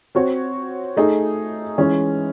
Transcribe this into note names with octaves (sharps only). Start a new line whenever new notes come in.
C4 F#4 C#5
A3 D#4 G#4
E3 G#3 C#4